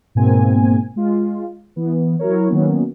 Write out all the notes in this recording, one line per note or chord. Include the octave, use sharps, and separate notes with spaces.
G#2 B2 A#3 C4 G#5
G#3 F4
E3 B3
F#3 E4 A#4 C#5
D#3 F#3 A#3 B3 C#4